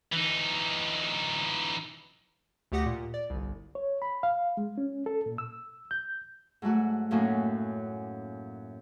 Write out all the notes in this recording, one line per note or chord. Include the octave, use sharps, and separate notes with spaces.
E3 D#4
D2 A3 G4 F#5 D#6 A#6
A#2
D5
G1 C2
C#5
B5
F5
G#3
C#4
A4
A#2
E6
G6
G#2 F#3 A3 F#4
F#2 A2 F#3 A#3 C#4 D#4